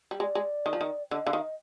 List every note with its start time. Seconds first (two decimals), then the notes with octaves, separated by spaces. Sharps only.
0.11 G3
0.20 G#3 D5
0.35 G#3
0.66 D#3
0.73 F3
0.81 D#3
1.11 D3 D#5
1.26 D3 F5
1.33 D#3
1.41 D#5